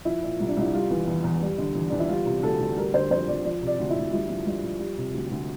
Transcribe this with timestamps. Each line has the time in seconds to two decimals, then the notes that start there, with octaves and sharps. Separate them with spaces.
0.05 F3 E4
0.22 A#2
0.40 C2
0.49 D4
0.57 C2 E4
0.74 G3 F4
0.90 E3
1.07 E2
1.24 E2
1.41 G3
1.58 D3
1.75 E2
1.90 E2 D4
2.00 E4
2.09 G3 F4
2.26 C3
2.43 D2 A4
2.60 D2
2.77 G3 A#4
2.94 D3 C5
3.11 F2 C5
3.28 F2 D5
3.45 F3 D5
3.62 C3
3.67 D5
3.79 D2
3.90 E4
3.96 D2
4.13 G2 E4
4.29 F3
4.46 G2
4.64 F3
4.80 G3
4.98 C3
5.14 D2
5.31 D2